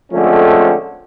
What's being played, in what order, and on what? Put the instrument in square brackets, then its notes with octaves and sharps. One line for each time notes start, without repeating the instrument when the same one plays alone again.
[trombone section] D3 F3 G#3 A3 C4 C#4